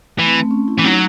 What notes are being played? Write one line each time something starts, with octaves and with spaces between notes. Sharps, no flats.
E3 A3
C4
A3
C#4
E4
E3
F#3 D#4